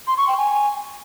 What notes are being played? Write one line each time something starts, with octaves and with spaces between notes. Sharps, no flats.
C6
C#6
G5
G#5